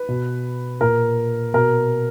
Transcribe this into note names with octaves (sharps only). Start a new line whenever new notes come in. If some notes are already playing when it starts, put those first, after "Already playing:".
Already playing: B4
B2
A#2 A#4
B2 A#4